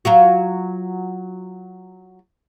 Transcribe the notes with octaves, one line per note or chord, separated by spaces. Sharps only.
F#3 F4 F#4